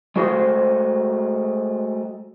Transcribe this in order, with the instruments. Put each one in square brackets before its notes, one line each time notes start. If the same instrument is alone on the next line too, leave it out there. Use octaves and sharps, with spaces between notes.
[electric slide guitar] G#3 A3 F#4 C5